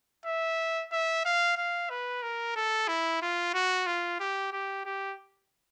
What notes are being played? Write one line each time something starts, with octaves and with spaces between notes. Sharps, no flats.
E5
E5
F5
F5
B4
A#4
A4
E4
F4
F#4
F4
G4
G4
G4